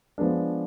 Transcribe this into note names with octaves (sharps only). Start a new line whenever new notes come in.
F3 G#3 B3 D4